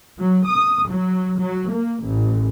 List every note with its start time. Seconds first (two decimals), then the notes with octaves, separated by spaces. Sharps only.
0.18 F#3
0.47 D#6
0.89 F#3
1.39 F#3
1.71 A#3
2.03 A1